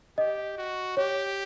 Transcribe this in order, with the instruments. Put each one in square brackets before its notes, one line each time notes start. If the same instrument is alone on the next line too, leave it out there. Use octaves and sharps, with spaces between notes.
[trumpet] G4 [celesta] D#5
[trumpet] F#4
[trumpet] G4 [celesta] C#5